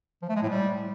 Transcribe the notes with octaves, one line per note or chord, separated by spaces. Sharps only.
F3
A3
G#3
A2
G3